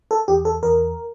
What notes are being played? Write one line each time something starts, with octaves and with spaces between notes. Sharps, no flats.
A4
E2 G4
A4
E2 A#4